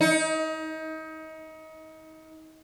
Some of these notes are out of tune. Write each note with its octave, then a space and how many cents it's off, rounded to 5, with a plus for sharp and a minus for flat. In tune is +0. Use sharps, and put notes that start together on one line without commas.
D#4 +30